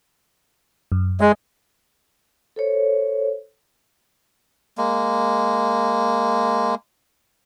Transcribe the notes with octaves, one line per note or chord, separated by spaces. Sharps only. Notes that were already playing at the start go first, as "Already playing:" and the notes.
F#2
G#3 D#5
A4 C5 C#5
G#3 A#3